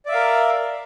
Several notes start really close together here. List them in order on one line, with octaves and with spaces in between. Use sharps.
D5 E5 F5 A#4